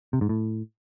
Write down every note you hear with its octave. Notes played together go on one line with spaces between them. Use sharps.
C3
G#2
A2